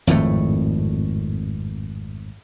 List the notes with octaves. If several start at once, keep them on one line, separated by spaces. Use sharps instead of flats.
G#1 F2 A2 A3